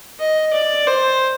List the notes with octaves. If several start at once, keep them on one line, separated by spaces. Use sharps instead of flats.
D#5
D5
C5